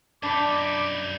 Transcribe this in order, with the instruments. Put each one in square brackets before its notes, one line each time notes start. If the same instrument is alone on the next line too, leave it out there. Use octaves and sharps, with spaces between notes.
[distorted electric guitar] F#2 D#4 [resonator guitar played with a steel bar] D4 [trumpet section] B5 D6